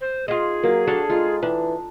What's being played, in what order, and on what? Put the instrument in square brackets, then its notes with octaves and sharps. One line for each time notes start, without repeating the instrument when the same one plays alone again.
[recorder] C5
[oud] D#4 F4 [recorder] G#4
[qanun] F#3 [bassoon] A#3
[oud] D4 [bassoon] F#4 [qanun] A4 F5
[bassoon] G#3 [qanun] D#4 F4
[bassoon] E3 [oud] D4